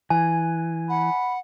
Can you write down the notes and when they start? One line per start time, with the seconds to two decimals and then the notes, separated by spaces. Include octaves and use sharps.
0.10 E3 G#5
0.89 F#5 B5